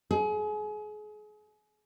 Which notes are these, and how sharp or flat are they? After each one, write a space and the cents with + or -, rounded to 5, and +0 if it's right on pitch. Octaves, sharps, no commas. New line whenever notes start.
G#4 +30